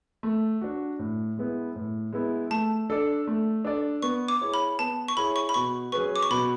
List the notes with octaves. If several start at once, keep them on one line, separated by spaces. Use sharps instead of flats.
A3
D4 F#4
A2
G#3 B3 E4
A2
G#3 B3 E4
A3 A5
D4 A4 D5
A3
D4 A4 D5
B3 C#6
D6
E4 G#4 C#5
B5
B3 A5
C#6
E4 G#4 C#5 B5
C#6
B5
B2 C#6
F#3 C#4 G#4 B4 C#6
D6
C#6
B2 B5